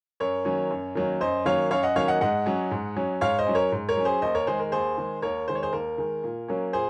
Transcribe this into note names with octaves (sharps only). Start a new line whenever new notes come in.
F#2 A#4 C#5
D#3 F#3 A#3 C#4
F#2
D#3 F#3 A#3 C#4
F#2 C5 D#5
D#3 F#3 A#3 C#4 C#5 F5
F#2 C#5 F5
D#5 F#5
D#3 F#3 A#3 C#4 C#5 F5
D#5 F#5
G#2 D#5 F#5
F#3 C#4
G#2
F#3 C#4
G#2 C#5 F5
C5 D#5
F#3 C#4
A#4 C#5
G#2
A#4 C#5
F#3 C#4
G#4 C5
D#2 C5 D#5
A#4 C#5
D#3 G#3 G#4 C5
A#4
D#2 G#4 C5
D#3 G#3
D#2 A#4 C#5
D#3 G#3 C5
C#5
G#4 C5
D#2 A#4
D#3 G#3
A#2
F#3 A#3 C#4
A#2 G#4 C5